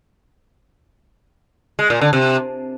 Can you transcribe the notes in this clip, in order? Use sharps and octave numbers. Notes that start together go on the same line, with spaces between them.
G#3
A#2
D3
C3